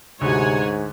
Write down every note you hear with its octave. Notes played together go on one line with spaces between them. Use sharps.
D2 G#2 C3 F#4 C#5 F#5 G#5